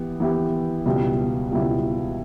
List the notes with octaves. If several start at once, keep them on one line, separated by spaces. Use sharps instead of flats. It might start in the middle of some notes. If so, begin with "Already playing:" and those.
Already playing: E3 B3 E4 G4
E3 B3 E4 G4
C#2 B2 G3 B3 E4
C#2 B2 G3 B3 E4